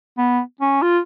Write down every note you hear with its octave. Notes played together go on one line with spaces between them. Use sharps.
B3
C#4
F4